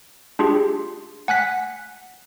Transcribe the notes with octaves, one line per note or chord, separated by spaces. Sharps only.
D4 F4 G4 G#4
F#5 G#5 F#6 B6